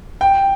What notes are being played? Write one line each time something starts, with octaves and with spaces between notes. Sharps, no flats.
G5